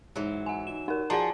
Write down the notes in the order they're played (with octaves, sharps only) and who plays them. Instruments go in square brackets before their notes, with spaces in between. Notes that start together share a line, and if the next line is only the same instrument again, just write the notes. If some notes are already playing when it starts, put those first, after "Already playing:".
[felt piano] G#2 [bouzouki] E3 F#3
[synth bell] F#5 G#5
[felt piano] D#4 [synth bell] E7
[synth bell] D#4 A#4 [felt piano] F#5
[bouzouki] F3 G#4 C#5 [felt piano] F#4 [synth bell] D5 F#5 A#5